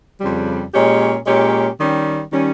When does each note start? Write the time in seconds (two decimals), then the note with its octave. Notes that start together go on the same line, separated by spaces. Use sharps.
0.21 F2 C#3 G3
0.74 A#2 G#3 C#4 G4 C#5
1.26 A#2 G#3 C#4 G4 C#5
1.78 D#3 G3 C#4
2.30 D#3 G3 C#4